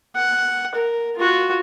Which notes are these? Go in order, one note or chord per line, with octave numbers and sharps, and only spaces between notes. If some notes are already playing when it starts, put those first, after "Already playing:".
F#5
A#4
F4 F#4